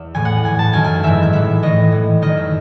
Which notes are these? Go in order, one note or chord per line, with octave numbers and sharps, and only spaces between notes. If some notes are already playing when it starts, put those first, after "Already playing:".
Already playing: E2 E5
A2 E3 G#5
F#5
A2 E3 G#5
A5
F#2 D#3 G#5
G#5
G#2 E3 E5
E5
A2 E3 E5
A2 E3 D#5
A2 E3
F#2 D#3 D#5
E5